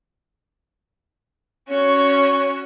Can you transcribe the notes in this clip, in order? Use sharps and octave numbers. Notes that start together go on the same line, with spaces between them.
C#4 F#4 C#5